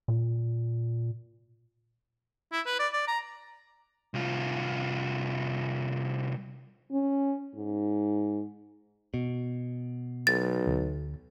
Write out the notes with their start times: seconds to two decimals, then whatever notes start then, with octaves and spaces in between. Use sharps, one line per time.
0.08 A#2
2.52 E4
2.66 B4
2.79 D5
2.93 D5
3.07 A#5
4.14 C2 F4
6.91 C#4
7.56 G#2
9.14 B2
10.27 B1 A6
10.67 D2